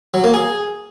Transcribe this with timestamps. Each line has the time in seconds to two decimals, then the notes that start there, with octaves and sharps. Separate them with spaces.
0.14 F#3
0.24 A#3
0.34 G#4